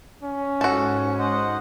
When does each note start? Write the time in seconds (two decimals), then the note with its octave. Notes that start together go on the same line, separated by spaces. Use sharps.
0.23 C#4
0.61 G#2 F#4 A4
1.19 C5 D#5 F#5